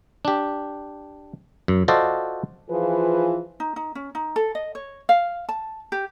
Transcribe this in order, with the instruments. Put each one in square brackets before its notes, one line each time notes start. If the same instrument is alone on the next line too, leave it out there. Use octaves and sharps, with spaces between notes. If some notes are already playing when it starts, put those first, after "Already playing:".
[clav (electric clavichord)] D4 G4
F#2
F4 F#4 A4 C5 D5 D#5
[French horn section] E3 F3 F4 G#4 B4
[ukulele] D#4
D#4
C#4
D#4
A4
D#5
C#5
F5
A5
G4